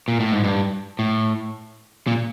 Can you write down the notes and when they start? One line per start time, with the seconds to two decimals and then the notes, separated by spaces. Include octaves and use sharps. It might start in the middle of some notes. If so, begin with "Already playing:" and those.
0.08 A#2
0.20 A2
0.32 G#2
0.44 G2
0.99 A2
2.07 A#2